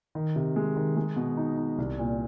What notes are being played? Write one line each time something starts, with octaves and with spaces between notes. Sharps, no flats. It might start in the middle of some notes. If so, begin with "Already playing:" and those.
D#3
C3
G#3
D#3
G#3
B2
D#4
D#4
C2
A#2